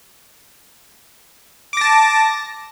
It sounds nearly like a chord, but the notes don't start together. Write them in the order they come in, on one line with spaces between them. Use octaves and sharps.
D6 A#6 A5